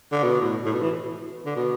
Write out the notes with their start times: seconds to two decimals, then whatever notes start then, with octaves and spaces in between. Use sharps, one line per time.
0.12 D3
0.24 B2
0.41 A2
0.66 A2
0.73 B2
0.82 E3
1.46 D3
1.56 B2